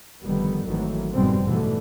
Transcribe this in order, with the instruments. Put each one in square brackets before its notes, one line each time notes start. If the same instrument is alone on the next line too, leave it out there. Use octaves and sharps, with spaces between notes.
[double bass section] F1 D3 D#3 G3 B3
G#1 D#3 E3 F#3 A3
F#1 F2 G#2 B2 G3 C4
G#2 B2 D3 E3 A3